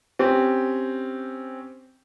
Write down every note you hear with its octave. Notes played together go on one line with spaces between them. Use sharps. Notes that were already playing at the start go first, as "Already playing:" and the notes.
C4 C#4 G4